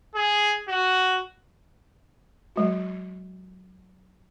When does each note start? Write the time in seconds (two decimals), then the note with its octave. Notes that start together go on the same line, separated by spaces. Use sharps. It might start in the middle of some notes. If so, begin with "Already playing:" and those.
0.15 G#4
0.69 F#4
2.56 F#3 G#3 F#4